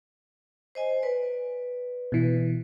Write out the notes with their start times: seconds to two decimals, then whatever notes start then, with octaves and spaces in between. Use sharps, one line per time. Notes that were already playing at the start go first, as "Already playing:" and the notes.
0.75 C5 D#5 G#5
1.03 B4 D5
2.12 B2 E3